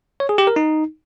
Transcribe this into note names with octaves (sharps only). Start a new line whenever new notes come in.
C#5
G#4
G4
A#4
D#4